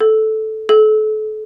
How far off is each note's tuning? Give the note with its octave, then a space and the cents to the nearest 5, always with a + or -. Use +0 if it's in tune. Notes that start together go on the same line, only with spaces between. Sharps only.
A4 -10
A4 -35